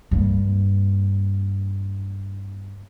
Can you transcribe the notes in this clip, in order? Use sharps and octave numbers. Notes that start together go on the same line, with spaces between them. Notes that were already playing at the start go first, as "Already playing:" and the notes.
G2 A#3